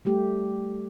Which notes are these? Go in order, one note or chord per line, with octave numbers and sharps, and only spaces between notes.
G3 A3 G4